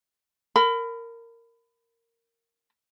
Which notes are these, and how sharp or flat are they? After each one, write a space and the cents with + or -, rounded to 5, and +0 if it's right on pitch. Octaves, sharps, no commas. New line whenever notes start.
A#4 -10 B5 +25